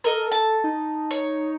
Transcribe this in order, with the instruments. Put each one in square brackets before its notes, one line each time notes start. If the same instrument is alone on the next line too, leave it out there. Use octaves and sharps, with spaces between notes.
[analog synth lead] A4 [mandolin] A#4 D#5
[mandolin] A5
[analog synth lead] D#4
[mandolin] C#5